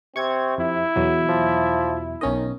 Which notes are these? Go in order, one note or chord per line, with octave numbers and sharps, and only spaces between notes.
C3 C4 C#6 G#6
F2 E4
E2 B2 F#3
F3
B1 D#3 C#4 D#5